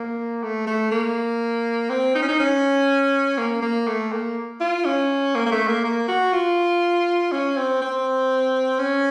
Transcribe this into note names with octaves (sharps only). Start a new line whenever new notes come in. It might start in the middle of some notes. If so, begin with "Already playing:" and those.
Already playing: A#3
A3
A3
A#3
C4
D#4
C#4
D#4
C#4
A#3
A#3
A3
A#3
F4
C#4
A#3
A#3
A3
A#3
A#3
F#4
F4
C#4
C4
C4
C#4